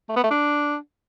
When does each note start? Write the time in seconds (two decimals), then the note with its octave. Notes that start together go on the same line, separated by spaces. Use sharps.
0.09 A3
0.16 B3
0.24 A3
0.31 D4